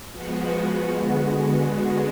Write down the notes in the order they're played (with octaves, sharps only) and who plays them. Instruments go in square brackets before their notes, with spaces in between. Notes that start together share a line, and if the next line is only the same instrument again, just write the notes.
[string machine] F3 G#3 B3 F#4
D3 G#3 B3 F#4